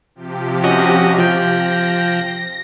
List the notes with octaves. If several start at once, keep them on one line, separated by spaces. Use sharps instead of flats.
C3 F3 G4
C#4 F#4 D#5
F3 G5 A#6